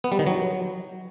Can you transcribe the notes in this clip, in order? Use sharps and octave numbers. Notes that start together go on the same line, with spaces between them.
B3
G3
D#3
F#3